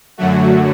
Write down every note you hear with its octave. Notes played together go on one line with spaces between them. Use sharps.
F#2 D3 F#3 A3 F#4